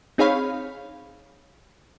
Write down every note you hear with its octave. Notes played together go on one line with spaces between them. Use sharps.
C4 D#4 G#4 C#5 F5 B5